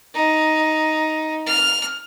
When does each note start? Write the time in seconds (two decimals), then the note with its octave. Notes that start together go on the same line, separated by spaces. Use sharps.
0.14 D#4
1.46 F6